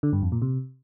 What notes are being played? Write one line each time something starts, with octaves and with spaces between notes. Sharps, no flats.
D3
G2
F2
A#2
C3